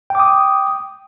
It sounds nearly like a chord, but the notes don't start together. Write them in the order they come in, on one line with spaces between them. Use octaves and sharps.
G5 D6 D#6